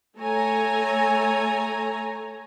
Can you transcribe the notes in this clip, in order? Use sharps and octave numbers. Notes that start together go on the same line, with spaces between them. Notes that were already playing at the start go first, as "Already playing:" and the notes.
A3 A4 C#5 G#5 A#5